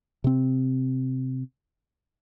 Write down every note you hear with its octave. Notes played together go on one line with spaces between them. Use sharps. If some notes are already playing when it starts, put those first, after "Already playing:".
C3 C4